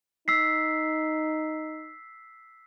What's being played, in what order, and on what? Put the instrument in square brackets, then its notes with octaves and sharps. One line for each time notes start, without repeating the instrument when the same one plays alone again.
[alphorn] D#4 [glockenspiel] E6 B6 C7